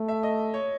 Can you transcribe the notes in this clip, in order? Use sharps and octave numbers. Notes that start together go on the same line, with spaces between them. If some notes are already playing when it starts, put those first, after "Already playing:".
Already playing: A3
E5
D#5
C#5